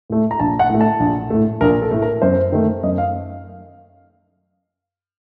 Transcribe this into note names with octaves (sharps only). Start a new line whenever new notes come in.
A2 A3
A#5
A#1 A5
F#5
A2 A3
A5
A#1
A2 A3
A#1 A#4
A4
A2 A3
A#4
F#2 C5
D#3 A3
F#2 D#5
F5